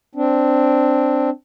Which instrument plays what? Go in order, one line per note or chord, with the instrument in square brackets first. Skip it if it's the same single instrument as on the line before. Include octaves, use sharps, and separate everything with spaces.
[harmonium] C4 D4